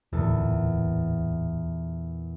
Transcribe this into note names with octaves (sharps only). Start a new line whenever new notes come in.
D1 E2 A#2 A4